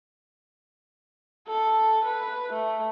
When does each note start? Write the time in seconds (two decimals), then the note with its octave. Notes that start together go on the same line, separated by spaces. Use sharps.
1.48 A4
2.05 B4
2.53 A3